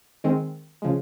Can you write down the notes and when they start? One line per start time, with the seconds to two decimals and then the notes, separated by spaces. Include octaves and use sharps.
0.24 D#3 G#3 C4
0.82 C#3 F3 G#3